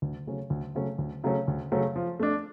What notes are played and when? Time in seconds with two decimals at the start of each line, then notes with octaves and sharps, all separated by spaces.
0.02 D2
0.27 C#3 F#3 A3 C#4
0.50 D2
0.75 C#3 F#3 A3 C#4
0.98 D2
1.24 C#3 F#3 A3 C#4
1.48 D2
1.72 C#3 F#3 A3 C#4
1.96 F3
2.20 A3 D4